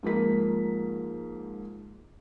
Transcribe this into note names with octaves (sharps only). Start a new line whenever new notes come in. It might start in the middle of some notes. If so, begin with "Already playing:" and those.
G#2 F3 A#3 B6